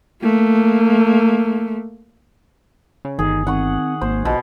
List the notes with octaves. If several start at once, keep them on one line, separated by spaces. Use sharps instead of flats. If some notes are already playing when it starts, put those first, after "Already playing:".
A3 A#3
C#3
G1 D#3 G#4
D#3 C4 F#5 C#6
G#1 A#3 C5
A#1 B2 D#5